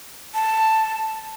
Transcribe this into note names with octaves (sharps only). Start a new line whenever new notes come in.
A5